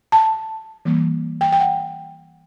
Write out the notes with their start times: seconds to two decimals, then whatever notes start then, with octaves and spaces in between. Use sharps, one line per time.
0.12 A5
0.85 E3 G3 A#3
1.41 G5
1.52 G5
1.60 F#5